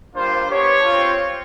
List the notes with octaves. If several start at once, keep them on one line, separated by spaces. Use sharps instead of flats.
G3 A#3 D4 F4 C5
B3 D4 G4 C#5
C4 F4